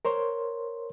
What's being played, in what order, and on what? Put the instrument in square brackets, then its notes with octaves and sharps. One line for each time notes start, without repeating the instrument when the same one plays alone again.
[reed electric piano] A#4 C5 C#5 C6